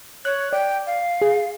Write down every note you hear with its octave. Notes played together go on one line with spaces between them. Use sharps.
C#5 F#6
D5 G5
F5
G#4